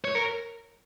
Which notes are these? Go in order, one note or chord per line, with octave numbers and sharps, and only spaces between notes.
C#5
A#4